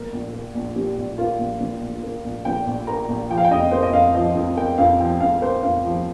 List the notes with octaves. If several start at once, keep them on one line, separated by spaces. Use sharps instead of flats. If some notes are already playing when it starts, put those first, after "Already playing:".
Already playing: A#2 A#4
A#1
A#3
A#1
A#2 G4
A#1
A#3 F4
A#1
A#2
A#1
A#3
A#1
A#2 G5
A#1
A#3 A#5
A#1
F3 G5
F5
G5
F2 D#5
A#3 C5
D#5
F2 F5
F3 D#5
F2
A#3 G5
F2 F5
F3 G5
F2 F5
A#3 C5
F2 F5
F3